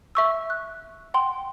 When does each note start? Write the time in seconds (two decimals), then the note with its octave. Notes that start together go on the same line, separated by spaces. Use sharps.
0.15 E5 C#6 E6
0.50 F#6
1.14 F#5 G5 C6